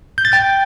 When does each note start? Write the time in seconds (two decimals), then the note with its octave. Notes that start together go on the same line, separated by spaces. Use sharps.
0.18 G6
0.25 A6
0.32 G5 G6